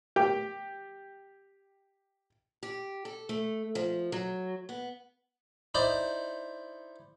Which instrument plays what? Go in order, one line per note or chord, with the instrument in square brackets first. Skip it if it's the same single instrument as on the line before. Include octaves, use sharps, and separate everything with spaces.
[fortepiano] G4 G5
[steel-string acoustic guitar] G4
A4
A3
F3
F#3
B3
[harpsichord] D#4 E4 C5 D5